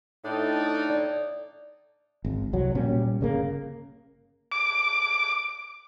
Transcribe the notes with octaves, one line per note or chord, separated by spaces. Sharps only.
A2 D4 D#4 A4
D5
G#1
C2 F#3
A#2 G3 C#4
G1 C#3 A#3
D6